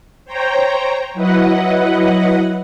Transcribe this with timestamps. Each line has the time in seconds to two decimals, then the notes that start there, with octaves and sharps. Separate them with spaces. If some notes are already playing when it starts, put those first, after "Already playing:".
0.25 C5 C#5 G5 A#5
1.14 F#3 E4 B4 D#5 F#5